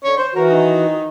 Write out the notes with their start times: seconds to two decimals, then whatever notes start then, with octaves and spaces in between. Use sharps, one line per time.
0.04 D3 C#5
0.16 C5
0.35 E3 F#4 A#4
0.49 D#3 D#4